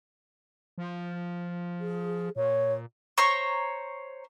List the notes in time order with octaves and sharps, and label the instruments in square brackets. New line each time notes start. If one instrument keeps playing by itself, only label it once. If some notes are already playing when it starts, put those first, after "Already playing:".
[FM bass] F3
[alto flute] G#4
[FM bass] A#2 [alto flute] C#5
[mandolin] C5 C#5 A#5 C#6